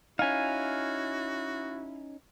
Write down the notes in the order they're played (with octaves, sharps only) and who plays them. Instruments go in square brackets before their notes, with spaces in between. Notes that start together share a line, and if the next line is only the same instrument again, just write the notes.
[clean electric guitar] C#4 D#4 [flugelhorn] E4 [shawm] F#4 [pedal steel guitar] F5 G#5